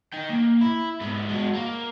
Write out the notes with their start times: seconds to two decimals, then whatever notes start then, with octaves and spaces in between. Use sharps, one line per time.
0.13 D#4 G5
0.29 A#3
0.62 E4
1.01 G#2 B3
1.29 G#3 F#4
1.54 A#3